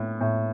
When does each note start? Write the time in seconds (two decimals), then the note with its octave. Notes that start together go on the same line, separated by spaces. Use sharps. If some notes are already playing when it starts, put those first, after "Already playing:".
Already playing: A2
0.21 A2